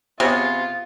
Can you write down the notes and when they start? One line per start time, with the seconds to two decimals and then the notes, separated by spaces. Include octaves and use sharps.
0.20 C3 B3 F4 G#4 C#5